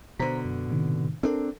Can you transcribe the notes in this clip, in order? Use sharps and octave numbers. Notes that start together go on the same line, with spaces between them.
B2 D3 C5 A#5 B6
F#2
A2 C3 D#3
C4 D4 A4 A#4